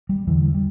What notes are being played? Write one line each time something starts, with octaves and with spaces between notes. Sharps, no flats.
G3
E2 D3 E3
G3